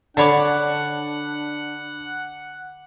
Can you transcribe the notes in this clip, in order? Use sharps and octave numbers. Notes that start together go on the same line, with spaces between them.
D3 D4 C#5 D5 F#5 A5 B5 D6